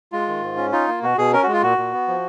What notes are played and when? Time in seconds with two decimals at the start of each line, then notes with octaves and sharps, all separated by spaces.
0.12 G#3 F4
0.28 D#3
0.42 G#2
0.57 C#4
0.72 D#4 F4
0.88 A#3
1.03 B2 F#4
1.18 B2 G#4
1.32 C#4 A#4
1.43 F#4
1.48 G#3
1.53 F4
1.63 A#2 F#4
1.78 A#2
1.93 B3
2.08 F3